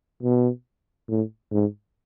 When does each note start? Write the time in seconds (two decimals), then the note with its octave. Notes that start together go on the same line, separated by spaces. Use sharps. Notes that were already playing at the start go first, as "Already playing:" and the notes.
0.23 B2
1.09 A2
1.52 G#2